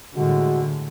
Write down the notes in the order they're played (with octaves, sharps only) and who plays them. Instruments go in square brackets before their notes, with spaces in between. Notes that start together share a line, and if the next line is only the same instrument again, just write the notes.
[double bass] A2 D3 [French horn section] G3 G#3 F#4